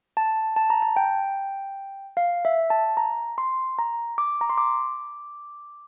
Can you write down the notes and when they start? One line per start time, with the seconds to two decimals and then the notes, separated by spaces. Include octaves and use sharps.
0.17 A5
0.56 A5
0.70 A#5
0.82 A5
0.96 G5
2.17 F5
2.45 E5
2.70 A5
2.97 A#5
3.38 C6
3.79 A#5
4.18 D6
4.41 A#5
4.50 C6
4.58 D6